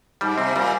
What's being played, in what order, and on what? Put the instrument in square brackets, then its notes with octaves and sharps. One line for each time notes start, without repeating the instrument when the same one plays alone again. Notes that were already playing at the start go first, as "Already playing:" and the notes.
[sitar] G#2 [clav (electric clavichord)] G3
[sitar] C3 [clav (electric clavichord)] C4
[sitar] A#2 [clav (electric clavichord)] G3